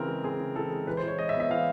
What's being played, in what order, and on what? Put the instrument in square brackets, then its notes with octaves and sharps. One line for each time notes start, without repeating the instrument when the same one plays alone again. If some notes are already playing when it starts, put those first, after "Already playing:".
Already playing: [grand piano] C#3 E3 C4 A#4
G#3
C4 G#4
C#3
E3 A4
G#3
E3 B4
C5
E3 C#5
G#3 D#5
E5
B3
E5
E3 F5